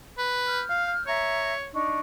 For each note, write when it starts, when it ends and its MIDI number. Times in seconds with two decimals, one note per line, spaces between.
0.18 0.62 71
0.45 1.05 89
0.45 1.05 91
0.69 0.93 77
1.07 1.71 73
1.07 1.52 76
1.07 1.52 82
1.73 1.99 62
1.73 1.99 63
1.73 1.99 85